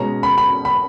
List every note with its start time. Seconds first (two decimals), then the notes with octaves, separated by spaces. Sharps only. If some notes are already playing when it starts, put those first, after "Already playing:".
Already playing: B2 G#3 C#4 A#5
0.23 B5
0.38 B5
0.65 B5